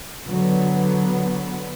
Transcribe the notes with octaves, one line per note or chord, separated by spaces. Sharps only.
D3 F#3 B3